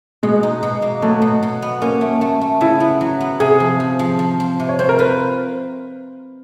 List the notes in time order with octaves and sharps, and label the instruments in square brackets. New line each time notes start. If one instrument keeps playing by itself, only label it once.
[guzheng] B2 [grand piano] G#3
[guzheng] D#4
B2
A#3
[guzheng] F#3 [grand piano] A3
[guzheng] B2
B2
B3
[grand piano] A#3 [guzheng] C#4
[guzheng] A3
A3
A3
[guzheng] C#3 [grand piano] E4
[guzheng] B3
F#3
B3
[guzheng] C3 [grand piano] G#4
[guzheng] F3
F3
F3
F3
C4
C3
[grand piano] C#5
[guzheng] C4 [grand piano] C5
[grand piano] A#4
[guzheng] F4 [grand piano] B4